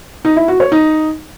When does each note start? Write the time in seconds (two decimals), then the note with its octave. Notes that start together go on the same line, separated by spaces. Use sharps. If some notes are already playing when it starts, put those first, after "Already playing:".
0.25 D#4
0.36 E4
0.48 F#4
0.60 C#5
0.72 D#4